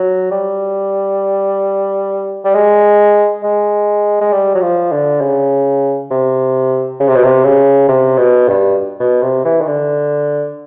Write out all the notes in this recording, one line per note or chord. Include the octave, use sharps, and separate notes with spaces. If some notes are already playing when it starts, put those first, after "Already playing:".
Already playing: F#3
G3
G3
G#3
G#3
G#3
G3
F#3
F3
D3
C#3
C3
C#3
C3
B2
C3
C#3
C3
B2
G2
B2
C3
E3
D#3
D3